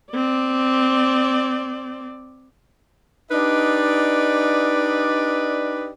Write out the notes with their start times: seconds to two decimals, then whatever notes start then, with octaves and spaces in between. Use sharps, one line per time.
0.13 C4 D5
3.32 D4 D#4 G4 B4 D5 D#5